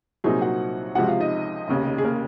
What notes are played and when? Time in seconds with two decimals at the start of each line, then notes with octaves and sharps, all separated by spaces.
0.24 C2 A#2 F#3 C4 D#4 G#4 G#5
0.42 F#4 F#5
0.95 C#2 C3 F3 G#3 F#4 F#5
1.08 F4 F5
1.20 D#4 D#5
1.68 F1 D#2 C#3
1.98 G#4
2.04 A#3 A#4